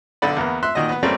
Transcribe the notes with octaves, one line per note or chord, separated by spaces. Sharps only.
B1 D3 D5 B5
E2 A#3 B3
E5 C6 F#6
A#2 D#3 F#4 D#5
B3 B4
G3 A3 A#3 C4 C#4 D5